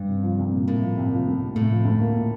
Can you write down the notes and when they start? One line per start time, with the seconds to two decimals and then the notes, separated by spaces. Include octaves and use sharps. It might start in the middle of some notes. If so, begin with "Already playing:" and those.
Already playing: G2
0.09 C3
0.23 F3
0.39 C2
0.52 A#2
0.68 A2 A#3
0.82 F3
0.97 C2
1.11 F3
1.27 D2
1.42 C3
1.55 A2 A3
1.71 F3
1.85 D2
2.01 A#3
2.15 A#2